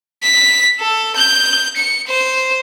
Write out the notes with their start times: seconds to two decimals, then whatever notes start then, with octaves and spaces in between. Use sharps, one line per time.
0.23 B6
0.80 A4
1.16 G6
1.77 C#7
2.07 C5